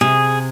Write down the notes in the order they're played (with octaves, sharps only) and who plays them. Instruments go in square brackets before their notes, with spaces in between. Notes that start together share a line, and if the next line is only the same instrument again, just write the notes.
[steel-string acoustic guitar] C3 [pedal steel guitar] G#4